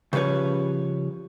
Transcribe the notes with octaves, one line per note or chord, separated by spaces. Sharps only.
C#3 F3 G3 B4 C#5